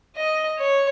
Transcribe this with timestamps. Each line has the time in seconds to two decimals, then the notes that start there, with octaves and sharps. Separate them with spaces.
0.16 D#5
0.59 C#5